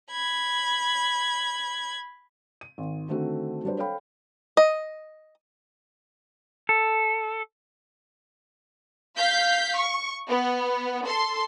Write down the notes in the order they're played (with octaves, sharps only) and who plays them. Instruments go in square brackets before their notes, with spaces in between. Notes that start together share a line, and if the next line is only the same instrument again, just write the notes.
[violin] B5 G#6
[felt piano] D#7
G#1
D3 D#3 A3 C4 F#4
F#3 G3 D4 B4 C5
A4 C5 C#5 F5 G5 B5
[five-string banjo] D#5
[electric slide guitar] A4
[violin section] F5 G6 B6
C#6
B3
A4 C6